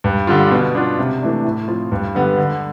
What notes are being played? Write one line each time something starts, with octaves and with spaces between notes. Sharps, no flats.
G2
D3 G3 D4 F4
B2
B3 D4 F4
C3
E3 A3 D4
A2
F3 C4 F4
G2
D3 G3 B3
D3